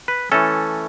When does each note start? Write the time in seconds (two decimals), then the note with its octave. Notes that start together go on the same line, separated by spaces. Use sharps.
0.08 B4
0.32 E3 A3 C#4 A4